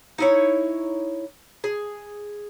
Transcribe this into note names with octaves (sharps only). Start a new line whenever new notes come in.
D#4 E4 C#5
G#4